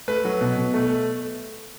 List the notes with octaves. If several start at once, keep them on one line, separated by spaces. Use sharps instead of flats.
A3 B4
F#3
B2
B2
A3